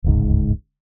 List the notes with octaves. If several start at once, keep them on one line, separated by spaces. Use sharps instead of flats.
D1 G1 C#2 G#2